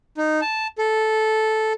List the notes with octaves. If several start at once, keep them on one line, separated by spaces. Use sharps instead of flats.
D#4
A5
A4